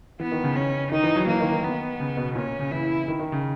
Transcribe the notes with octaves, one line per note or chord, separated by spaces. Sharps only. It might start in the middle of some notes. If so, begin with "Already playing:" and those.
E3 B3
D#3
C#3
C#4
D#3 D#4
E3
F#3
E3 A#3
D#3
D#3
B3
C#3
B2
A#2 C#4
A#2
C#3
E3 E4
D#3
D#3
C#3